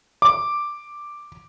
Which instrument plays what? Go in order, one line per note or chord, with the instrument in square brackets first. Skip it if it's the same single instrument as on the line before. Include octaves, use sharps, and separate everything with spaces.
[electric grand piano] D6